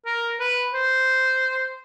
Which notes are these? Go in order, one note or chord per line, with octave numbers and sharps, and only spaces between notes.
A#4
B4
C5